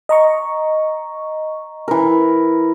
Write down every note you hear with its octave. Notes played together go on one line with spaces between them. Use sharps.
D#5 A#5 C#6
E3 A#4